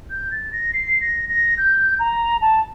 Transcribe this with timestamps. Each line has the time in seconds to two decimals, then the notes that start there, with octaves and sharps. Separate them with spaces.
0.10 G6
0.31 A6
0.52 A#6
0.73 C7
1.01 A#6
1.29 A#6
1.58 G6
1.99 A#5
2.41 A5